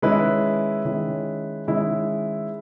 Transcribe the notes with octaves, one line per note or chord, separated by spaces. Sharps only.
D#3 G#3 C#4 E4 B4
D#3 G#3 C#4 E4
D#3 G#3 C#4 E4